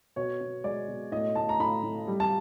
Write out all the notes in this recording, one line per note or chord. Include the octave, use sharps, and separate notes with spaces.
B2 C#5
B2
G#3 D5
B2
A2 D#5
A2 A5
A#5
A2 B5
A2
G3
A5